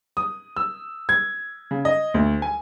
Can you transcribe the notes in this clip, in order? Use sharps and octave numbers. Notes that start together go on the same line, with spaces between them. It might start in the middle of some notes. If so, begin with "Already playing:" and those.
D#6
E6
G#6
C#3
D#5
D2
G#5